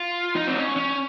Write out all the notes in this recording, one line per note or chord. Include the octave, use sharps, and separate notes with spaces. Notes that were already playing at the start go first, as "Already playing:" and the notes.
Already playing: F4
D#4
C4
C#4
C#4